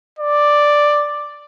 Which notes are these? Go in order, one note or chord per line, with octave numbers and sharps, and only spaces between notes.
D5